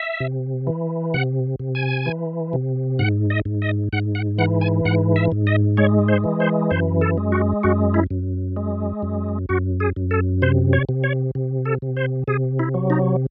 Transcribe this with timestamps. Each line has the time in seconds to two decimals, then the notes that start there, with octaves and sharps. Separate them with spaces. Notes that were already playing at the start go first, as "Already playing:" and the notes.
Already playing: E5
0.20 C3
0.67 E3
1.14 C3 F#5
1.60 C3
1.75 G#5
2.06 E3
2.53 C3
2.99 G#2 F#5
3.30 D#5
3.45 G#2
3.62 D#5
3.93 G#2 F#5
4.15 F#5
4.38 E3 F#5
4.61 G#5
4.85 G#2 F#5
5.16 E5
5.32 G#2
5.47 D#5
5.77 G#3 C#5
6.08 C5
6.24 E3
6.40 C5
6.71 F#2 C5
7.01 A4
7.18 G#3
7.32 F#4
7.63 F#2 F#4
7.94 E4
8.10 F#2
8.57 G#3
9.02 F#2
9.49 F#2 F#4
9.80 G#4
9.96 F#2
10.11 A4
10.42 C3 C5
10.73 C#5
10.89 C3
11.04 C#5
11.35 C3
11.65 A4
11.82 C3
11.97 C5
12.28 C3 G#4
12.59 E4
12.74 F#3
12.90 D#4